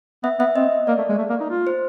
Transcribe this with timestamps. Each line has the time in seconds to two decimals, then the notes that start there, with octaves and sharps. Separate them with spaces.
0.23 B3 E5
0.39 B3 E5
0.56 C4 D#5
0.87 A#3 D5
0.98 A3
1.09 G#3
1.18 A3
1.29 A#3
1.41 D#4
1.50 F4
1.67 C5